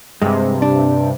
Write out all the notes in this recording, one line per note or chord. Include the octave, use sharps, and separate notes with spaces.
G2 C3 G#3
D4